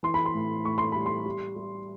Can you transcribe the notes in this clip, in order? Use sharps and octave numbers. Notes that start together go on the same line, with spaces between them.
E3 C6
B5
C6
A2
A2 C#6
C6
G3 B5
C6
G3
G3